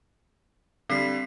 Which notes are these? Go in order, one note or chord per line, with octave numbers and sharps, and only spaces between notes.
D3 G3 C4 B6 C7